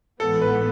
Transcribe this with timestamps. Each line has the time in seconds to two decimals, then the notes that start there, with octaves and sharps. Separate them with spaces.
0.20 A1 G#2 E3 B3 A4
0.41 B4